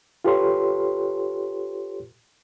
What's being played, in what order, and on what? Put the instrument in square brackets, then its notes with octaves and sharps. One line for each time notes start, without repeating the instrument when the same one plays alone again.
[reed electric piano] F4 G4 A4 B4 C#5 C6